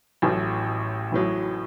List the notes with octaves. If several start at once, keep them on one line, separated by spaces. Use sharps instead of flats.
A1 A2 F#3
A1 A2 F#3